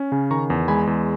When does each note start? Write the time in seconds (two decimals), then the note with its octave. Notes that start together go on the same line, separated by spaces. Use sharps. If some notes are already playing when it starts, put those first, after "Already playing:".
Already playing: C#4
0.12 C#3
0.31 D#3 A#5 C#6
0.50 E2
0.68 G#3 G#5 B5
0.87 E2